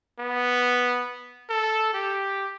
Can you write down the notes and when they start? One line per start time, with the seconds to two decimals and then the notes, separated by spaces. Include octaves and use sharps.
0.19 B3
1.50 A4
1.94 G4